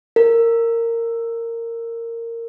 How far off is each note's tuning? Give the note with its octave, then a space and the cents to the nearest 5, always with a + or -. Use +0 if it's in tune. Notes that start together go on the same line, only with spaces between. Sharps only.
A#4 -15